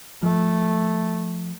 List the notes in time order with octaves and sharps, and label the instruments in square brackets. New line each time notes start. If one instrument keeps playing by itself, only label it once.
[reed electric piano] F3 [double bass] A3